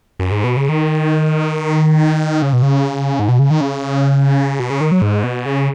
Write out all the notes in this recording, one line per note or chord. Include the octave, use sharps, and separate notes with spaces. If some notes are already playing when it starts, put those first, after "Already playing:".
F#2
G#2
B2
C#3
D#3
C#3
B2
C#3
G#2
B2
C#3
D#3
C#3
B2
C#3
D#3
F#3
G#2
B2
C#3